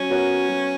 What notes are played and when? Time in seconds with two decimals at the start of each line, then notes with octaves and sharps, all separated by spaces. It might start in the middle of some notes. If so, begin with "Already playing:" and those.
Already playing: F#3 C#4
0.10 B3 F#4 A#4 C#5
0.48 F#3